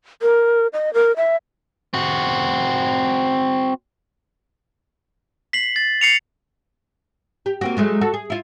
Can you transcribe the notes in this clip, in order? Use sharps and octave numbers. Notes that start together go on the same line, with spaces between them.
A#4
D#5
A#4
E5
C4 F#4
B6 C7 F#7
A6
C7 C#7 F7
G4
A#3 C4 F#4
F#3 G#3 A3
F#4 A4
G#4
E4 F4